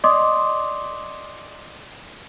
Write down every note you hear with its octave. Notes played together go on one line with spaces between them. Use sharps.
D5 D#5 C6 D6 D#6